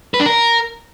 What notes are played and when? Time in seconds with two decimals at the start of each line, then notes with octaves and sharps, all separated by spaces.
0.14 B4
0.20 D4
0.26 A#4